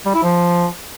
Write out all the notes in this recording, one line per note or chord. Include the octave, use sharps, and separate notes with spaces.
G3
E4
F3